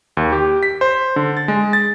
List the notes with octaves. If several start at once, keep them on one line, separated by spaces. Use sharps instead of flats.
D#2
G4
B6
C5
D3
A6
G#3
A6